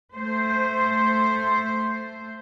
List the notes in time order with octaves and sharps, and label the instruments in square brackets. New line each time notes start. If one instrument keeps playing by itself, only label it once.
[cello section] A3 C5